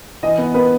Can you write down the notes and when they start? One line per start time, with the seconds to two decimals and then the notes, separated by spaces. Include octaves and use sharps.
0.23 E3 D#5
0.38 B3
0.54 B3 B4